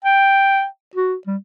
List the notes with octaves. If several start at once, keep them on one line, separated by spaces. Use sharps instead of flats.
G5
F#4
G3